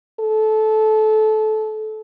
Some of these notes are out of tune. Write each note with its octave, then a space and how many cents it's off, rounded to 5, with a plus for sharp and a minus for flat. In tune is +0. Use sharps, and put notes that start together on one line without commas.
A4 -20